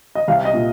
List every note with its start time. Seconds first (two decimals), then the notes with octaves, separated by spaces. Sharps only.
0.15 D#5
0.28 C2 F5
0.45 D#5
0.53 A#2